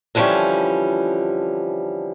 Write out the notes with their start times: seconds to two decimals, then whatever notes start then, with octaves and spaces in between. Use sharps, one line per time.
0.15 D3 E3 F3 G3 C#4